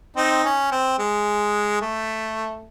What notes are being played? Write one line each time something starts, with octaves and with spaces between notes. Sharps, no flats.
C4 D#4
C#4
C4
G#3
A3